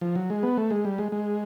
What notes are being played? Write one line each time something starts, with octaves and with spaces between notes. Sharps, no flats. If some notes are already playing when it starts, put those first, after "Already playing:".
F3
F#3
G#3
B3
A3
G#3
G3
G#3
G#3